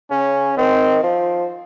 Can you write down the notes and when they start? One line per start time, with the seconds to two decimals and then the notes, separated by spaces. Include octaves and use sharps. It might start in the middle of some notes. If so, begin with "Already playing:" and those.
0.10 C#3 C#4
0.57 D#3 C4
1.03 F3